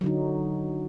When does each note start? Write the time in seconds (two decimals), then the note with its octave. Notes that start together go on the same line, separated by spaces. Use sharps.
0.01 F#3
0.04 D3
0.06 D#4